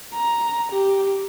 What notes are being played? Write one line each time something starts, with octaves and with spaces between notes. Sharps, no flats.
A#5
G4